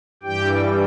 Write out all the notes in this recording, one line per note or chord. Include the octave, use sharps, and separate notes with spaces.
G2 E3 G3 G4 G5